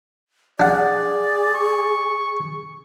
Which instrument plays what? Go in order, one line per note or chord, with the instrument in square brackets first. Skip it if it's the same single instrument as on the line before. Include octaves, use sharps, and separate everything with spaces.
[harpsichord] D4 F#5 [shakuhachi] G#4 [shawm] D5
[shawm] C#6